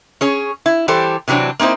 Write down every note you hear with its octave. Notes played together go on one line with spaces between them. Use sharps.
C#4 G#4 C#5
E4
E3 G3 G4 A4 C5
C3 E3 F#3 C4 D4
A#3 C4 D#4 E4 C5